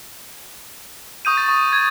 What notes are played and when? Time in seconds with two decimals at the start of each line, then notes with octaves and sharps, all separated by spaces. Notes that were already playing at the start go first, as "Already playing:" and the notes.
1.25 C#6 D#6 G6 D#7
1.37 A6
1.48 C#6
1.73 G#6